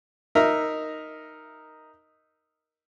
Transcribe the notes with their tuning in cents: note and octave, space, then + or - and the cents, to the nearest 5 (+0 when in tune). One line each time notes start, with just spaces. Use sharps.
D#4 +0 A#4 +0 E5 +0